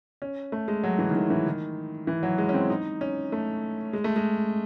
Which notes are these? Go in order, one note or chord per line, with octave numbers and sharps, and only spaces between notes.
C#4
A3
G#3
F#3
E3
D#3
E3
E3
D#3
E3
F#3
G#3
C#4
C4
D#4
C#4
A3
G#3
A3
G#3